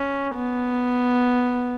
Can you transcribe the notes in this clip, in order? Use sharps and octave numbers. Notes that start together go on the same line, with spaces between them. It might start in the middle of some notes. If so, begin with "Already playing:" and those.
Already playing: C#4
B3